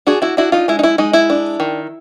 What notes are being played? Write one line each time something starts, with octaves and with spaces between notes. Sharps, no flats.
D4 F#4 G#4
E4 F#4
D4 E4 F#4
D#4 F4
G#3 E4
D#4
E4
G#3 D#4
E4
D4
D#3